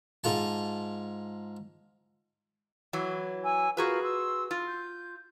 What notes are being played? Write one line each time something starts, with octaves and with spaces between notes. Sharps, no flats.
G#2 F4 A5
E3 F#3
G#5 E6
F4 F#4 G#4 A#4 B4
C6 E6
F4
G6